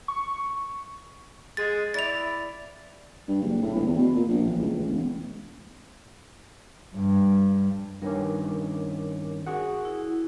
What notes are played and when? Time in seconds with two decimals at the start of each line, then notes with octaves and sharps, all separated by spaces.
0.08 C#6
1.57 G#3 G#4 A6
1.94 E4 D5 A6 F7
3.28 G2
3.42 F#1
3.62 A2
3.74 G1
3.86 E2
3.99 B2
4.15 A#2
4.29 A#1
4.46 A1
4.60 C#2
4.77 A1
4.90 E1
6.96 G2
8.02 G2 D#3 C#4 A#4 C#5 D6
9.47 F#4 G#4 F#5
9.85 E4